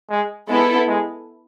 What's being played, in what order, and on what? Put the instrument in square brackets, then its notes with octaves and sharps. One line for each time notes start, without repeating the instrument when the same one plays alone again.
[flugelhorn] G#3
[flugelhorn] G#3 [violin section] B3 E4 A4
[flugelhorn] G#3